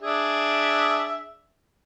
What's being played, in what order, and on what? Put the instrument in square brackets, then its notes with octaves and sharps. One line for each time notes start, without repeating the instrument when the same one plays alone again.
[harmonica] D4 G#4 E5